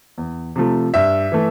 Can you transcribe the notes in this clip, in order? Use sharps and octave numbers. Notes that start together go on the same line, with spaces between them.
E2
C3 F3 A3
G2 E5
E3 A3